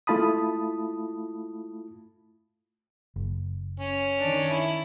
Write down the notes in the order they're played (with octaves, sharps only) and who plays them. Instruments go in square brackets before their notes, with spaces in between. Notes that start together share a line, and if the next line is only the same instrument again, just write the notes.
[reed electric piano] A3 E4 F4 A5 B5 D#6
[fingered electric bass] F#1
[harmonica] C#4
[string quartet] D#3 D4
E4